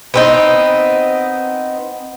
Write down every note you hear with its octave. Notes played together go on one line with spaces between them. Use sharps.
B3 C4 D#4